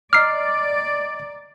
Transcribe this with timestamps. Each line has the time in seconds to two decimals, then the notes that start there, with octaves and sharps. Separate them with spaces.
0.13 D5 D#5 A#5 D6 F6 C7